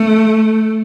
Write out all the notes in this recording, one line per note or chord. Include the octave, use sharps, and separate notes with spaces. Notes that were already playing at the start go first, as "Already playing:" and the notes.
Already playing: A3